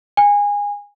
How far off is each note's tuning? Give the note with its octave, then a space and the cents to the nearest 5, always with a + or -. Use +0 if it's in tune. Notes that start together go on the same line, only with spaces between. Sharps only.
G#5 -20